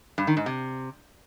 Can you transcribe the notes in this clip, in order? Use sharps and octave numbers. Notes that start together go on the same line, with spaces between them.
G2
D#3
G#2
C3